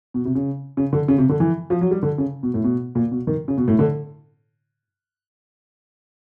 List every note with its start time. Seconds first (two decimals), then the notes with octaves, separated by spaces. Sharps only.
0.14 B2
0.25 C3
0.35 C#3
0.77 C#3
0.93 D3
1.08 C#3
1.18 C3
1.29 D3
1.40 E3
1.70 F3
1.81 F#3
1.91 G3
2.03 D3
2.18 C#3
2.43 B2
2.54 A2
2.64 B2
2.95 A#2
3.12 B2
3.27 D#3
3.48 C#3
3.58 B2
3.68 A2
3.79 D3